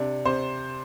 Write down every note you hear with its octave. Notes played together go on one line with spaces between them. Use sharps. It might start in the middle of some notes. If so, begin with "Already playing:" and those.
Already playing: C3 D4
C3 C5